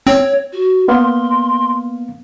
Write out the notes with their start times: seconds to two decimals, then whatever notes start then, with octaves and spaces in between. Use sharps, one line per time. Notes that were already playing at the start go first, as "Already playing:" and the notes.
0.07 C4 C#5
0.53 F#4
0.88 A#3 B3 F5 C6